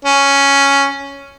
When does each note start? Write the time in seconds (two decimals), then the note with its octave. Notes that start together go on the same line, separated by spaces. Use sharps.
0.05 C#4